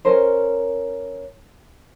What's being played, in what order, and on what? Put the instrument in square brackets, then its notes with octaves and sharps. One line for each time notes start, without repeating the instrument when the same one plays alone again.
[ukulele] C#4 A#4 C5